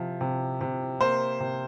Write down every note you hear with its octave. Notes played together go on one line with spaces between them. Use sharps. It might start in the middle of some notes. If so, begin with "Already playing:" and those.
Already playing: C3 F3
C3
C3
A#3 C5
C3